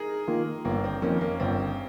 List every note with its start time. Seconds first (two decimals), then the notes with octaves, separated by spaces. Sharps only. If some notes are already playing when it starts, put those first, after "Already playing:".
Already playing: D#4 G#4 A#4
0.28 D#3 A#3 F4
0.65 G1 A#3
0.84 C4
1.02 F2 D#3 A#3 C#4 D#4
1.21 A#3
1.40 G1 C4